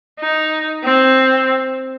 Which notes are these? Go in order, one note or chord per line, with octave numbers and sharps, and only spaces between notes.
D#4
C4